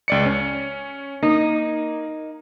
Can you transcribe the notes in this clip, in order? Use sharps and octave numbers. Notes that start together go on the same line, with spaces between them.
C#2 D5 C#7
C#4
A#3 D#4